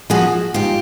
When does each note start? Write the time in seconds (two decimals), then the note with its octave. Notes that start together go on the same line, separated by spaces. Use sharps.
0.10 F3 F#4 G#4
0.54 G#2 F4 G4